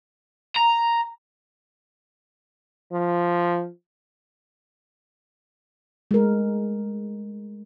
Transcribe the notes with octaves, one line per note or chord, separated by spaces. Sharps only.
A#5
F3
G#3 A3 A#4